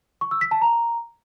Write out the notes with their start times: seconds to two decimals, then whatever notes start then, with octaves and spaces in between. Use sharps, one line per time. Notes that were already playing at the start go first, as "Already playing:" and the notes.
0.21 C#6
0.31 E6
0.41 B6
0.51 A5
0.61 A#5